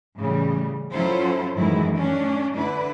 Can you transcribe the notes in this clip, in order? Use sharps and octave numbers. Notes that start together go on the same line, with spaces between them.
A2 C#3 E3 G3
F#3 C#4 E4 F4 A4 C5
F#2 A2 D#3 E3 G#3 E4
A3 C#4 D4
D3 D4 E4 B4